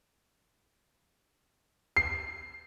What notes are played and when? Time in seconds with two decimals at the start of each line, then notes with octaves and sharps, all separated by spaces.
1.97 C7